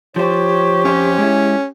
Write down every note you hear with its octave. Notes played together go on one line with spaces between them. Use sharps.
F3 G4 C5 C#5
F2 C#4 F4 C5
G#3 E4